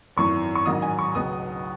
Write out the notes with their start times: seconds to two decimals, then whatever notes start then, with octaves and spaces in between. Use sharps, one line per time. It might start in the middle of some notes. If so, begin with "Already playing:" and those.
0.17 G#1 F#2 E3 C#6
0.55 C#6
0.66 A1 G#2 D#3 F#3 D#6
0.82 G#5
0.99 C#6
1.15 C#2 B2 F#3 D#6